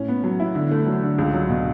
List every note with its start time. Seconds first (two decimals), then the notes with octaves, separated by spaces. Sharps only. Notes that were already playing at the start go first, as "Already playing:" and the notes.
Already playing: A2 C#4
0.08 B3
0.24 F#3
0.40 E4
0.55 D3
0.71 A3
0.87 F#3
1.03 D3
1.18 C#2
1.34 F#3
1.49 B2